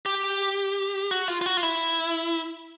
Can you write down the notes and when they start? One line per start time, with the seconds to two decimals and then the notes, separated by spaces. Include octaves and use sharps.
0.06 G4
1.11 F#4
1.28 F4
1.41 F4
1.46 F#4
1.57 F4
1.63 E4